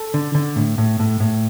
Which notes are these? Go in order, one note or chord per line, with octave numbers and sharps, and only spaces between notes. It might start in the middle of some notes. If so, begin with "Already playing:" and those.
Already playing: A4
D3
D3
A2
A2
A2
A2